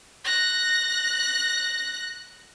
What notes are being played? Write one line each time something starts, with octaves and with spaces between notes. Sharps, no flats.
F#6 A#6